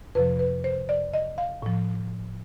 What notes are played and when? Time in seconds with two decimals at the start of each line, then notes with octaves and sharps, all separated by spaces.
0.15 F2 C3 F3 B4
0.39 B4
0.64 C5
0.89 D5
1.14 D#5
1.38 F5
1.62 A2 F3